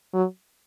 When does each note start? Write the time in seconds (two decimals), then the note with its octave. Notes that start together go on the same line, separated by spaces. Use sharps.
0.13 F#3